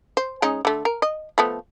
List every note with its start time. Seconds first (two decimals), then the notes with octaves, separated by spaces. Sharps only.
0.17 C5
0.42 G#3 C#4 D#4
0.65 D3 A3
0.85 A#4
1.02 D#5
1.38 F3 A3 B3